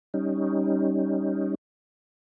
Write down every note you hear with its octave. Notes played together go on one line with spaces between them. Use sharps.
G3 C#4 D#4